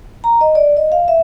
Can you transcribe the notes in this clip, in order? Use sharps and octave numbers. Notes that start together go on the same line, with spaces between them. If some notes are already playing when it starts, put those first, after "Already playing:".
A#5
D#5
D5
D#5
F5
E5